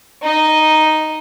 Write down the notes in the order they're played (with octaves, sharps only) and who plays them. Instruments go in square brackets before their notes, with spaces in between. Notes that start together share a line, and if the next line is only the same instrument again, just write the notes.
[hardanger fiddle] D#4 D#5